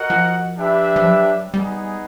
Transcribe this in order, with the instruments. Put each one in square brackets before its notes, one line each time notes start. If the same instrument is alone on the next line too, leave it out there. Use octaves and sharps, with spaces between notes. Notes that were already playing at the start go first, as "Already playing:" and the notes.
Already playing: [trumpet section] F#4 A#4 D#5 F#5
[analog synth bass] F3
[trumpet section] D4 G4 B4 E5
[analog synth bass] F3
F#3
[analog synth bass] G3 [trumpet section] B3 D#4 G#4